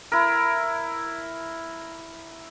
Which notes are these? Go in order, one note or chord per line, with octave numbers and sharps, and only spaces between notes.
E4 A#4